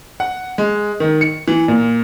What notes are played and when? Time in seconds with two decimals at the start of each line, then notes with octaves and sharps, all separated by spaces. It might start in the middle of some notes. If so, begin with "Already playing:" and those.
0.20 F#5
0.58 G#3
1.00 D#3
1.21 C#7
1.48 E3
1.68 A#2